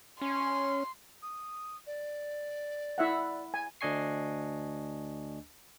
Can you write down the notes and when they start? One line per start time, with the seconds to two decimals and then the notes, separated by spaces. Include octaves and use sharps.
0.21 C#4 C6
1.22 D#6
1.87 D5
2.98 E4 E5 F#5
3.54 G#5
3.81 D2 D4 D#5 G#5 C#6 C7